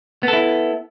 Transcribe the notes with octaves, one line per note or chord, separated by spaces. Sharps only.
B3 E4 A4